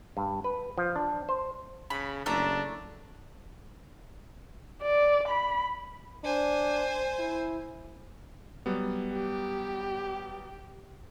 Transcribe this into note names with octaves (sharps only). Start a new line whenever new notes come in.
G2
B4
F3
D4
C5
C#3 B5
F#1 A3 D4 E5 A#5
D5
B5
D4 C5 G#5
E4
F#3 G3 B3
G4